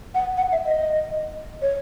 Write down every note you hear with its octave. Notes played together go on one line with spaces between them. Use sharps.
F#5
F#5
E5
D#5
C#5